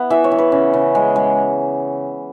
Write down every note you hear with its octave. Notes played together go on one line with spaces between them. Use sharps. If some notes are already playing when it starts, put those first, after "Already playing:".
Already playing: B3 E4 F#5
E3 E5
C#5
E3
B4
C#3
C#3
G#3
G#3